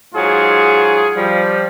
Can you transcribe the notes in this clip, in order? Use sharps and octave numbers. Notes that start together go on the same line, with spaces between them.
G#2 F#3 F4 G#4
F3 G3